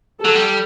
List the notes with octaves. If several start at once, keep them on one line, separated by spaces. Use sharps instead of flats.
F#3 A4
G3